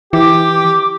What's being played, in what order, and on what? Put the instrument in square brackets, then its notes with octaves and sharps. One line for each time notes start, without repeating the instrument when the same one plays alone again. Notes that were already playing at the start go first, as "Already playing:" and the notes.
[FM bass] E3 [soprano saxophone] G4 [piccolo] D6